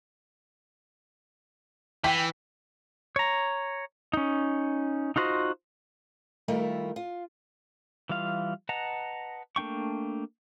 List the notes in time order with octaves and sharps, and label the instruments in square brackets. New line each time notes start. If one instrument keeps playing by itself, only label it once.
[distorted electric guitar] E3 [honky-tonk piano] G5 B6
[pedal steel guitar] C#5 A#5
C#4 D#4
D#4 F4 F#4 C5 D#5
[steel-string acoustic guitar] D#3 G3 A3 E4 F4 A#4
F4
[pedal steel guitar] E3 G3 F4 F5
B4 D#5 F#5 A5 A#5
A3 A#3 D4 G5 C#6